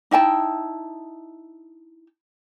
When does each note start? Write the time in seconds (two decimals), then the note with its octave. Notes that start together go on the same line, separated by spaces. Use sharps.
0.11 D#4 E4 G5 A5